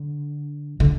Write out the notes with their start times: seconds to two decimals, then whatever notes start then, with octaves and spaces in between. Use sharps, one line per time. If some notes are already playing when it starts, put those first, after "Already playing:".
Already playing: D3
0.80 D3